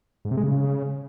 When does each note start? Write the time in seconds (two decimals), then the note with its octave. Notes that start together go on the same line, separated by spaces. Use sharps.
0.25 G#2
0.31 C3
0.37 G#3
0.43 C#3